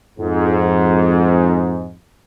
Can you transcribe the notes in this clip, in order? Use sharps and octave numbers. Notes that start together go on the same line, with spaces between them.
F2 G#2